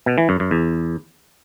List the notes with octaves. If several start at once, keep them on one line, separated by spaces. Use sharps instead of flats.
B2
E3
F#2
F#2
E2